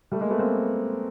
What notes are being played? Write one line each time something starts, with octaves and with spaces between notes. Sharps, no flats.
G3 A3
G#3 A#3
A3 B3
A#3 C4